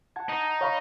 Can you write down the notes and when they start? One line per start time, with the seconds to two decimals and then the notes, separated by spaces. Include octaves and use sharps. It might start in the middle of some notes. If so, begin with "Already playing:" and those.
0.16 F#5 A5 G#6
0.29 D#4
0.61 C#5 F5 B5